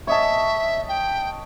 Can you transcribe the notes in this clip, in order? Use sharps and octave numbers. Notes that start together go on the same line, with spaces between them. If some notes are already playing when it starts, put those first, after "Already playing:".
C#5 D#5 E5 A5
G5